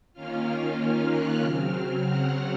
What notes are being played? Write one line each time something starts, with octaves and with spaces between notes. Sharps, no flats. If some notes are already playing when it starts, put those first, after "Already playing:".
D#3 A#3 C#4 F4 F6
F#6
C#3 F#3 C4 F6
F#5